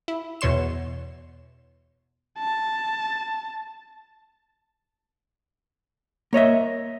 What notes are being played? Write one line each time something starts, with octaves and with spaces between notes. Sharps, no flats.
E4
E2 B2 C#5 C6 E7
A5
A#3 C#5 D#5 E5